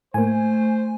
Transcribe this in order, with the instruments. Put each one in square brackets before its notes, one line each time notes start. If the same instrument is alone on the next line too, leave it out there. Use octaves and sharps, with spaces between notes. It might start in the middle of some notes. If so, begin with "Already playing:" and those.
[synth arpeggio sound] A2 A#3 [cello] A3 [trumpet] C5 [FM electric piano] G#5